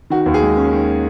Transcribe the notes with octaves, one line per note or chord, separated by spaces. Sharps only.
D#3 F#4
D#2
G#4
G#3
C#4
D#3